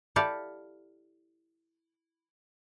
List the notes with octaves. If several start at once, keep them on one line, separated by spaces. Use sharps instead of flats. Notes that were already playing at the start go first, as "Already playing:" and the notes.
E4 G4 A4 D5 F5